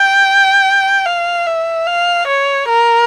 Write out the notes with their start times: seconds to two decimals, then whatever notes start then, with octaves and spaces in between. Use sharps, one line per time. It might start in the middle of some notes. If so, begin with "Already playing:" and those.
Already playing: G5
1.05 F5
1.46 E5
1.87 F5
2.28 C#5
2.69 A#4